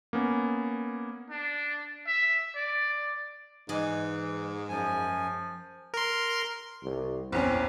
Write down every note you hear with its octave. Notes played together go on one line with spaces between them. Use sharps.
A#3 B3 C#4
D4
E5
D5
G#2 E3 G#4 D5 D#5
F#2 F3 G#5
A#4 C6
C2
A#1 E2 C4 C#4